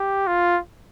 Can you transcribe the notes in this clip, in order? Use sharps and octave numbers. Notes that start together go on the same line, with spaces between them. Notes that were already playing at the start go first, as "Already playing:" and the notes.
Already playing: G4
F4